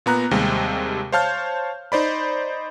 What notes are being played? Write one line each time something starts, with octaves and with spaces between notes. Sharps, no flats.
A#2 B3 A#5 F#6
D#2 C3 G3 G#3
C5 C#5 F5 A5 F6 G6
D#4 C5 D5 B5